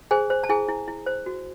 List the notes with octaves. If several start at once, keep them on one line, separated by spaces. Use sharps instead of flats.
G#4 C5 G#5
C5
A5
E4 G#4 G#5
E4
E4
C5
F#4